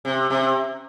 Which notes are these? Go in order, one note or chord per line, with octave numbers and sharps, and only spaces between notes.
C3
C3